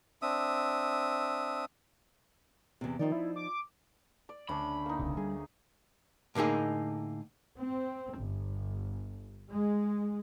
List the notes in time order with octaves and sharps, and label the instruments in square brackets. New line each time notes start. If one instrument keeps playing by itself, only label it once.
[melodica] C4 D4 E5 D#6
[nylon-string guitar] E2 C3
[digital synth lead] D#3 [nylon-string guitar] F3 D#4 D5
[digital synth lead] E4
D6
[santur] D5
[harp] D2 [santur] C#4 D4 [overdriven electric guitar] B5
[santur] A#3 D#4
[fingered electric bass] D1 C2 C#3
[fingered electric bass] G3 [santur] G#4
[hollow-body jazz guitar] A2 D3 A#3 D#4 G#4
[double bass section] C4
G1
G#3